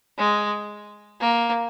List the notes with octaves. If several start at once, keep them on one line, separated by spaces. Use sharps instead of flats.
G#3
A#3